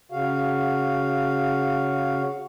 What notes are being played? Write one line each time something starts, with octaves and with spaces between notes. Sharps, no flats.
C#3 F#4 F5